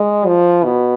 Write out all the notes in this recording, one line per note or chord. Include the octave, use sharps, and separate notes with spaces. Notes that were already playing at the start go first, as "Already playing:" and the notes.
Already playing: G#3
F3
B2